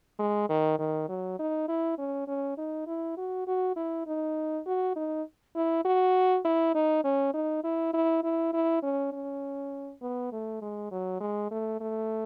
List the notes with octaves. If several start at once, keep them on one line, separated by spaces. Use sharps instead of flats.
G#3
D#3
D#3
F#3
D#4
E4
C#4
C#4
D#4
E4
F#4
F#4
E4
D#4
F#4
D#4
E4
F#4
E4
D#4
C#4
D#4
E4
E4
E4
E4
C#4
C#4
B3
A3
G#3
F#3
G#3
A3
A3